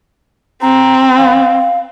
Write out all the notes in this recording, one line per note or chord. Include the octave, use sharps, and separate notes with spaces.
C4 A#5
F5